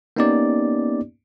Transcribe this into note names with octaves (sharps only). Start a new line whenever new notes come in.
A#3 B3 C#4 D#4 G4 D5